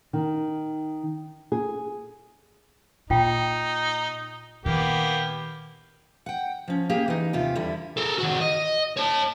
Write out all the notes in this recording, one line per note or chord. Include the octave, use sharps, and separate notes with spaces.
D#3
G#4
A#2 D#4 F4 G5
A#2 D#3 A#3 B3 G4
F#5 G5
F3 C#4
A#3 G4 G#4
E3 D#4
D#2 C3 F4 G4
E2 D3 G3 E4
A4 A#4
D#3 F#4
D#5
C#5 A5